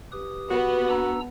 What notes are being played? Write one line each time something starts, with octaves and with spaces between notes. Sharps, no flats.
G4 B4 D#6
B3 F#4
D4 A#5 E6